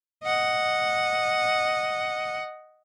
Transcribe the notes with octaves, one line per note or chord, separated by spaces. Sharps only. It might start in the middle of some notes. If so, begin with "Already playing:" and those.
D#5 F#5